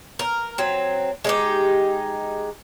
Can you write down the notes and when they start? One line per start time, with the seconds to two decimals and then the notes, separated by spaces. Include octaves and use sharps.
0.19 A#4
0.58 F#3 C4
1.24 G#3 D#4 G4